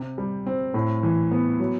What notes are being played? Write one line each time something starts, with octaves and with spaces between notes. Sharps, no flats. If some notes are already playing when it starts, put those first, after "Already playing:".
Already playing: C3
G3
C4
A2
E3
B3
F#3